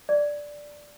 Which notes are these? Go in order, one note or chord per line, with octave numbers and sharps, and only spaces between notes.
D5